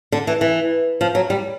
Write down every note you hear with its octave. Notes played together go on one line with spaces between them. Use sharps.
D3
E3
E3
F3
F#3
G3